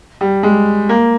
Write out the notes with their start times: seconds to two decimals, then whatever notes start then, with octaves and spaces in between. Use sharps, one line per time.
0.21 G3
0.43 G#3
0.89 A#3